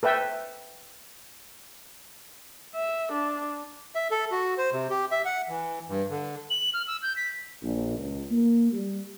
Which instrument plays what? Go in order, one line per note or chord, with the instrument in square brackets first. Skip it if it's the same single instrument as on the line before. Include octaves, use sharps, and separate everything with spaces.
[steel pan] A4 B4 E5 G5
[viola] E5
D4
[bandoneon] E5
A4
F#4
C5
C3
G4
E5
F#5
E3
G2
D3
[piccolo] F#7
F6
E6
G6
B6
[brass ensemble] A#1
C#2
A#3
G3